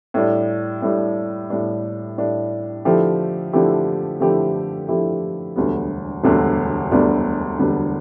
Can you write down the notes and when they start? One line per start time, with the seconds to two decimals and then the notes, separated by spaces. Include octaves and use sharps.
0.14 A2 G3 D4
0.82 A2 G3 D4
1.50 A2 G3 D4
2.18 A2 G3 D4
2.85 D3 F3 A3 E4 G4
3.53 D3 F3 A3 E4 G4
4.20 D3 F3 A3 E4 G4
4.89 D3 F3 A3 E4 G4
5.56 E1 D2 D3 G3 B3
6.24 E1 D2 D3 G3 B3
6.91 E1 D2 D3 G3 B3
7.59 E1 D2 D3 G3 B3